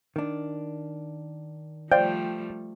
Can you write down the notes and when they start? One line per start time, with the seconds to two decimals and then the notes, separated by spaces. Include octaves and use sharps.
0.16 D#3 D4
1.92 F3 G3 A3 C5 D5 F5 G5